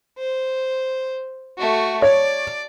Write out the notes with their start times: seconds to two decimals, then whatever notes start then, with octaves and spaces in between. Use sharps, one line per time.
0.18 C5
1.58 A3 F#4
2.02 C#5 D5